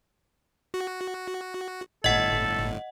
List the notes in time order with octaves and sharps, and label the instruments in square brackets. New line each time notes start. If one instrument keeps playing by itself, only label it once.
[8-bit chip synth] F#4
[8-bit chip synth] G1 A2 [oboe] A4 [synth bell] D#5 F#5